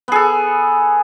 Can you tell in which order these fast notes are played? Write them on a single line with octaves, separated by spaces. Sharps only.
B3 G#4 A4